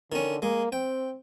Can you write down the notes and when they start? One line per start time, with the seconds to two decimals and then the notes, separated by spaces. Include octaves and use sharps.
0.12 D3 D#3 C#4
0.42 G#3 A#3
0.72 C4 G5